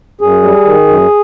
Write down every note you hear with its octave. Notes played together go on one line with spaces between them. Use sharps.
F#2 G#4
G3
D#3
F#2